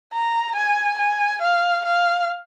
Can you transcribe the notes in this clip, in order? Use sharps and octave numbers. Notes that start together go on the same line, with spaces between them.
A#5
G#5
G#5
F5
F5